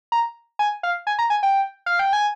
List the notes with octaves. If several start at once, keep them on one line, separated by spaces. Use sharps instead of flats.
A#5
G#5
F5
G#5
A#5
G#5
G5
F5
G5
G#5